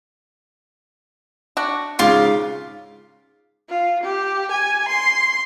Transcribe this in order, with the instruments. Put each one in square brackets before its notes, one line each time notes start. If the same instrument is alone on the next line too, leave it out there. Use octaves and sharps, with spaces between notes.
[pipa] D4 F#4
[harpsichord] G#2 C#3 [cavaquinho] F4 D6
[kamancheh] F4
G4
G#5
C6